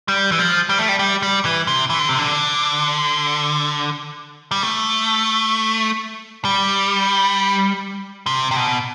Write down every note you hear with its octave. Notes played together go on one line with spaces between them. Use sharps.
G3
E3
F3
G3
A3
G3
G3
G3
E3
C3
E3
D3
C3
D3
G3
A3
G3
C3
C3
B2